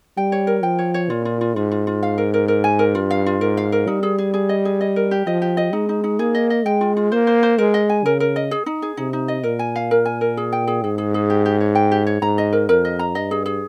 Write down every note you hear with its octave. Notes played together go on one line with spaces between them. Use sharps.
G3 G5
C#5
A#4
F3 G5
C#5
C#5
A#2 F4
F4
F4
G#2 F4
F4
F4
F5
A#4
A#4
A#4
G#5
A#4
G2 F4
F5
F4
G#2 A#4
F5
A#4
G3 D#4
G#4
G#4
G#4
D#5
G#4
D#5
A#4
G4
F3 D#5
G4
D#5
G#3 D#4
D#4
D#4
A#3 G#4
D#5
D#5
G#3 G5
F4
F4
A#3 C5
C5
C5
G#3 A#4
D#5
G#5
C#3 A#4
A#4
D#5
G#4
D#4
G#4
C3 D#4
D#4
D#5
A#2 A#4
G#5
F5
A#4
G#5
A#4
G#4
G5
G#4
G#2 G#4
G#4
G#4
G4
G4
C#5
G5
G4
C#5
G#2 A#5
D#5
A#4
F2 A#4
D#5
A#5
G2 D#5
G#4
G#4